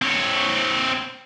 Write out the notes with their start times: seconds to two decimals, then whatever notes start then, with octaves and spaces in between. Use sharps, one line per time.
0.02 C4 C#5